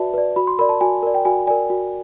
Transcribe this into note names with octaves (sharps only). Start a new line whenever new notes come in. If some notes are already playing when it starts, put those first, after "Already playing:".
Already playing: F#4 B4 D5 E5 A5
B4 D5
F#4 B5
C6
A#4 D5 B5
A5
F#4 G#5
A#4 D5
G5
F#4 G#5
A#4 D5 G#5
F#4